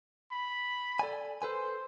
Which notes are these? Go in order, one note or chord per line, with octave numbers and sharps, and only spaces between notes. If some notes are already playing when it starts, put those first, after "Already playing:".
B5
A4 D5 G#5
A4 B4 C5 G#5